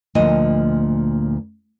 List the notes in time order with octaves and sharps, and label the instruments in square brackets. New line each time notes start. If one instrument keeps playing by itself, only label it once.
[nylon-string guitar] D2 A#2 F3 D#5